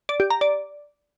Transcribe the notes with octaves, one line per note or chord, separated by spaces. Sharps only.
D5
G4
A#5
D5